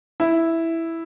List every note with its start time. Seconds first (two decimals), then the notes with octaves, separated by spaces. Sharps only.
0.20 E4